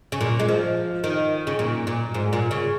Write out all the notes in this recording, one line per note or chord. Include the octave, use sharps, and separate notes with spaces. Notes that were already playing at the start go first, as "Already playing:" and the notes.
C#3
A#2
G#3
F3
D#3
C#3
A#2
A#2
G#2
A#2
C#3